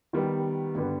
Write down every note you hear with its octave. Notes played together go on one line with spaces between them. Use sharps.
D#3 G3 B3
G2 D3 G3 B3